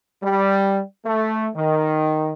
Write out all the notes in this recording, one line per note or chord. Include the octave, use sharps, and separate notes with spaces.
G3
A3
D#3